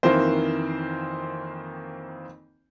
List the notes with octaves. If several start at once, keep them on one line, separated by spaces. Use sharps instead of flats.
F2 D#3 E3 A#3 C4 C5